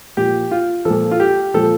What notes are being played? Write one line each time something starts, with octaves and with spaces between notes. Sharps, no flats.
A#2 F3 G4
F4
A#2 F3 A4
F4
G4
A#2 F3 A4